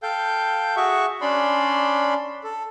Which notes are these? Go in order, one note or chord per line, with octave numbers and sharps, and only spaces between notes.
A4 F5 G5 G6
F#4 G#4 E5 F#5 C#6
C#4 D4 D5 B5 C6
A4